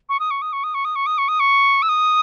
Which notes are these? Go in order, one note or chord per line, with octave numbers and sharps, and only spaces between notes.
C#6
D#6
C#6
D#6
C#6
D#6
C#6
D#6
C#6
D#6
C#6
D#6
C#6
E6
D#6